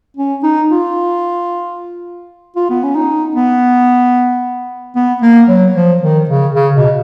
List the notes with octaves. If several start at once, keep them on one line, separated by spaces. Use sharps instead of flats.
C#4
D#4
F4
F4
B3
C#4
D#4
B3
B3
A#3
F#3
F3
D#3
C#3
C#3
B2